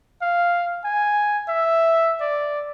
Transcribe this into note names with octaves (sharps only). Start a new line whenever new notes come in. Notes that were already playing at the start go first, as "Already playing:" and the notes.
F5
G#5
E5
D5